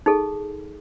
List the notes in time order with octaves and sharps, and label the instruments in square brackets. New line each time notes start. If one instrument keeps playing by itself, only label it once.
[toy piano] D#4 G#4 A4